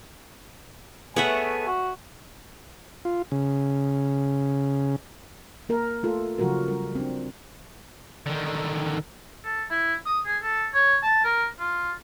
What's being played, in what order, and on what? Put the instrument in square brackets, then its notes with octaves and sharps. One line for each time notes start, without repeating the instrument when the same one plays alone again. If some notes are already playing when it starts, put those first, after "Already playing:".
[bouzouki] A3 B3 G#4 [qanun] C#5 E5 F#5 [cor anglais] G#5
[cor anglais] F#4
[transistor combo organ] F4
C#3
[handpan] A#3 A#4
A3 F4 A4
C#3 F3 F#3 F4 F#4 A#4
G3 A#4
C4 D4
[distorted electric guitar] D3 D#3
[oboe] A4
E4
D#6
G#4
A4
C#5
A5
A#4
F4